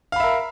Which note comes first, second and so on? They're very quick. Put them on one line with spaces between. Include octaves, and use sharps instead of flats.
F5 B5 E5 A#4